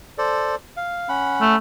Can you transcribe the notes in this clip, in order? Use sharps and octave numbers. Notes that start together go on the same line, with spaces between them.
A4 C5 D5
F5
C#4 F#5 B5
A3